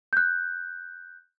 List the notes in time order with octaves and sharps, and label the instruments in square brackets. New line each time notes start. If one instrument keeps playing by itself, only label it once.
[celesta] F#6 G6